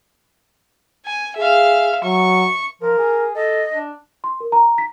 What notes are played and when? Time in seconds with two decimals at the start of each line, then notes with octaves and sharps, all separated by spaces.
1.06 G#5
1.37 G#4 E5 F5
2.04 F#3 C#6
2.81 F3 A#4
2.98 G#4
3.35 A4 D#5
3.73 D4
4.24 C6
4.40 A#4
4.52 A#5
4.78 B6